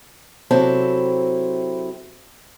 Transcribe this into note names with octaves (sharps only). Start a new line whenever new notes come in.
C3 F#3 C4 E4 A4